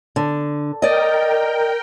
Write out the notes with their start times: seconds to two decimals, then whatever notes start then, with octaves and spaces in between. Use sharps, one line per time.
0.16 D3
0.82 A#4 D5 D#5 G5